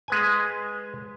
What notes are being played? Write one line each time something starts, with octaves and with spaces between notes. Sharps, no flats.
G#3 B4 G#5